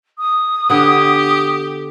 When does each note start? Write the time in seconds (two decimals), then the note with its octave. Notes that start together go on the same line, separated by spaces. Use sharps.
0.18 D#6
0.70 D3 B3 G4